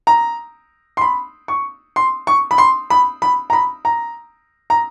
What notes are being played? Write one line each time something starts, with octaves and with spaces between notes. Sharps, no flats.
A#5
C6
B5
C#6
C6
C#6
B5
C6
B5
B5
A#5
B5
A#5
A#5